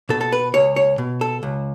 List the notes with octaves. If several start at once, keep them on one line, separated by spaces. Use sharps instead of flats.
B2 A4
A4
B4
C#2 C#5
C#5
B2
A4
C#2